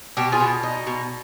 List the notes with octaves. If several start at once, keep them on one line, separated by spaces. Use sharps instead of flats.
B2 G4
F4 G#4
B2
D#4
B2